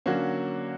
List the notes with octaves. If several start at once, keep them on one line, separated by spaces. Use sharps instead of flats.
D3 F#3 A#3 C#4 F#4